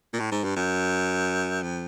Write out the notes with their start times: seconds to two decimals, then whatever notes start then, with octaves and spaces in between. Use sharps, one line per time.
0.14 A#2
0.20 A2
0.32 G#2
0.44 G2
0.56 F#2
1.63 F2